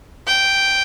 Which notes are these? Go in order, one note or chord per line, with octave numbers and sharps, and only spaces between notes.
G5